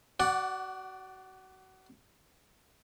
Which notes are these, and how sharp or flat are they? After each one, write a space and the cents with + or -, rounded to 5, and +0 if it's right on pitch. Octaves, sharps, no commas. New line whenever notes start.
F#4 +25 D5 +0 F#5 +0